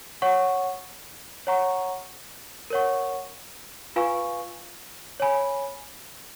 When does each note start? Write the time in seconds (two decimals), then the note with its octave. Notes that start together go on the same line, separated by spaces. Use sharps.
0.22 C#5 F#5 C#6
1.47 C#5 F#5 A#5 C#6
2.70 A#4 C#5 F#5 C#6
3.96 F4 B4 F5 G#5 C#6
5.20 C#5 G#5 B5